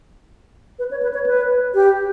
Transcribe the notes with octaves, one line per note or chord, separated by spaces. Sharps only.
B4
C#5
B4
C#5
B4
G4